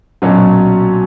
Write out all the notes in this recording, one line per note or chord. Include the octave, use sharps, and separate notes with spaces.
B1 A#2 F#3 C#4